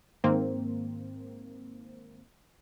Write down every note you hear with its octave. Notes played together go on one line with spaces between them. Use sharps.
G#2 D#3 A#3 C4